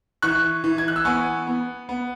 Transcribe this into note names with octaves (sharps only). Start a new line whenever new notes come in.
E3 C#6 F#6
E3
G#6
F#6
E6
B3 G#5 C#6
B3
B3